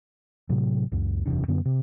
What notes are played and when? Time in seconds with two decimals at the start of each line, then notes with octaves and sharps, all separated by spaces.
0.49 A2 C3 F#3
0.92 C#2 F#2
1.26 F#1 E2 C3 D4
1.48 F#2 D3 B3
1.65 C3